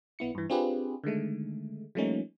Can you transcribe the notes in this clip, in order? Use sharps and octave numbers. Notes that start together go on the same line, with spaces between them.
B1 B3 E4 C#7
G2 E3
C4 D4 F4 G4 G#4 B4
D3 D#3 G#3 A3
F3 G3 A3 A#3 C#4 D#4